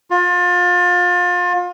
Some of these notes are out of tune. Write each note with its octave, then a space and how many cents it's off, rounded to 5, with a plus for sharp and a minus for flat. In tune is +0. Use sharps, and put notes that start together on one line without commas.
F4 +30